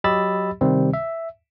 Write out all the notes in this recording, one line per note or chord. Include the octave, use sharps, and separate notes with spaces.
F#3 G4 D#5 B5 E6 A6
C3 D#3 G3 C4
E5